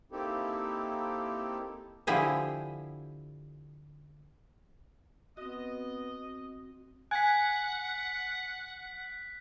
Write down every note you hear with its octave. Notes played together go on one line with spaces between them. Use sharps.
A#3 C4 D#4 E4 G4 A4
D3 F3 E4 G4 G#4
B3 C4 F#4 D#5
F#5 G#5 F#6 G#6 B6